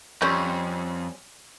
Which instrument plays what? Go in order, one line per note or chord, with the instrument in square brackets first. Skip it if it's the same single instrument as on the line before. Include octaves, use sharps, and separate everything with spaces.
[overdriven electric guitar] F2 [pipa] G3 C4 C#4